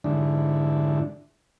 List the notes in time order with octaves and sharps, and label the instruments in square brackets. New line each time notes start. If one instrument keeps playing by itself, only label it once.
[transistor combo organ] G#2 D3 D4 E4